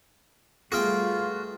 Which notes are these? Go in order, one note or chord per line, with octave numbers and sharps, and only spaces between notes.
G3 A3 F4 F#4 G#4 B4 G5 F6